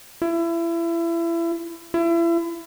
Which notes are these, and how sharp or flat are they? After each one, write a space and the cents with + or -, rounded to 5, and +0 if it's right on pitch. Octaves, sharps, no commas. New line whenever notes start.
E4 +30
E4 +35